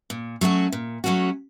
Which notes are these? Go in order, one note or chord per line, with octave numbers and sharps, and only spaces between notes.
A#2
F#3 A3 C#4 F#4
A#2
F#3 A3 C#4 F#4